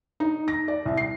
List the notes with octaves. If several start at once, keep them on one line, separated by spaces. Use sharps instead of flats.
D#4
A#6
D5
C2
C7